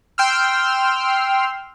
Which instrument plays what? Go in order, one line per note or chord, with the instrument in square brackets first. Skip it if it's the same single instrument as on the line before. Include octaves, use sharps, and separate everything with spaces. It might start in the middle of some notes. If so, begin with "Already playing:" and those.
[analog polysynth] G5 C6 E6 F6